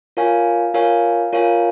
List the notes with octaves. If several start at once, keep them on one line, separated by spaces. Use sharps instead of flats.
F4 A#4 C#5 F5 G#5
F4 A#4 C#5 F5 G#5
F4 A#4 C#5 F5 G#5